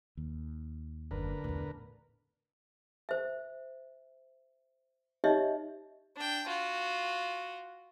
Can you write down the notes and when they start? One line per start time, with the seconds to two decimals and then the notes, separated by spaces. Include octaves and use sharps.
0.17 D#2
1.11 F#1 D3 A#4 B4
1.44 E2 A2
3.09 C5 E5
5.24 D#4 G4 C#5 D#5 E5
6.17 D4 G5
6.47 F4 F#4